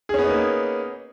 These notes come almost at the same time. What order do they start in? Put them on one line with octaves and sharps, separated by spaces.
G#4 C#4 B3 D#4 A#3